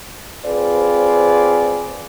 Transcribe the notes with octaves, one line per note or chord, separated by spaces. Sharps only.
C4 F4 G#4 B4 C5 D5